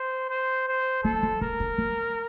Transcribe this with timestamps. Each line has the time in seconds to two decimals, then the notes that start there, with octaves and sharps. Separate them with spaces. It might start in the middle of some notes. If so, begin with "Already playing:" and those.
Already playing: C5
0.30 C5
0.68 C5
1.04 A#3 A4
1.23 A3
1.41 G3 A#4
1.60 D3
1.78 F3